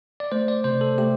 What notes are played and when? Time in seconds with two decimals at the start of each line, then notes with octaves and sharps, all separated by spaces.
0.20 D5
0.32 A3 C5
0.48 D5
0.64 C3 C5
0.81 A4
0.98 A3 G4